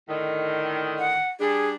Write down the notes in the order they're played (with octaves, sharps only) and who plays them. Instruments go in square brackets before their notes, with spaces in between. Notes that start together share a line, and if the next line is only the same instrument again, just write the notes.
[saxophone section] A2 D3 D#3
[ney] F#5
[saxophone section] G3 D4 [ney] G#4